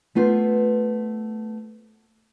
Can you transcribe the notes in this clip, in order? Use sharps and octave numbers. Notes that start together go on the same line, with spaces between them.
A3 B3 F4 C5